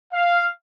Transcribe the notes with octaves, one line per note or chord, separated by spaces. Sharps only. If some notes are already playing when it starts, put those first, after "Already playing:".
F5